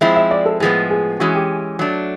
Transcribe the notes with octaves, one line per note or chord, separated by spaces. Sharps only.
F3 G#3 C4 E4 E5
E5
D5
A4
A2 F3 G#3 B3 G#4
G#4
E3 G#3 C#4 F#4
G4
F#3 A3 D4